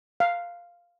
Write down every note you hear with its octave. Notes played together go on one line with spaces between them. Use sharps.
F5